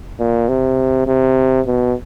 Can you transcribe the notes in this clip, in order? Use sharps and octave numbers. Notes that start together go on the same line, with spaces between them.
A#2
C3
C3
B2